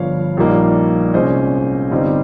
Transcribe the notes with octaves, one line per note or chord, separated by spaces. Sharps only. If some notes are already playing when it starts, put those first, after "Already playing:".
Already playing: G1 G2 F3 C#5 F5
A#1 A#2 G3 A#3 D#4
C2 A#2 G#3 C#4 C5 D#5
G1 G2 G3 C4 D#4